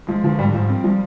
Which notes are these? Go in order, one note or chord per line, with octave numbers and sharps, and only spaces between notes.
F3 G#3
D3 F3
G#2 G3
G#2 F3
C4
F3 G3